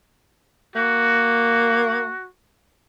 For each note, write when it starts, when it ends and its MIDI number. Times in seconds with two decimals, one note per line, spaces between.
0.76 2.12 58
0.76 2.28 66